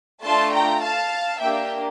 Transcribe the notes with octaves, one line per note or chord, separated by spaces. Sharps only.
A3 D4 F4 A5 C6
G5 A#5
F5 A5
A#3 D4 G4 E5 G5